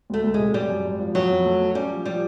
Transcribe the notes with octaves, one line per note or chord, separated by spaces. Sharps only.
D2 A3
D2
C3 G#3
F#2 G3
F#2
G#1
F3
F2 F#3
F2
A3
A3
G3 C#4
F3
F3 G3